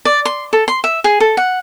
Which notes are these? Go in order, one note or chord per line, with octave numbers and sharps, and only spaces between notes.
D5
C6
A4
C6
E5
G#4
A4
F#5